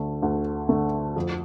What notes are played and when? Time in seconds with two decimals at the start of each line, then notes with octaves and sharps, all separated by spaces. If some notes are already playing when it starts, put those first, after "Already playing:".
Already playing: D2 D3 A3
0.22 D2
0.69 D3 A3
1.16 F2